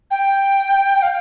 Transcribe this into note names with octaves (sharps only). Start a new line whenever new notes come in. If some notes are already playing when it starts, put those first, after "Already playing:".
G5
F5